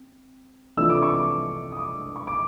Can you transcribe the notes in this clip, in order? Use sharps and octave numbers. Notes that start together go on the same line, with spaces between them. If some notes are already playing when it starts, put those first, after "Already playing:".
Already playing: C4
C3 E3 A3 D4 F4 E6
D6
C#6
D6
D#6
D6
C#6
D6